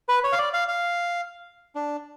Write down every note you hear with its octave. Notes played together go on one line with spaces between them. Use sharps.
B4
C#5
F5
D5
F5
F5
D4